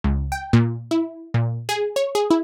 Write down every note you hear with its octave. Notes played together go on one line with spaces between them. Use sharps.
C#2
G5
A#2
E4
A#2
G#4
C#5
G#4
E4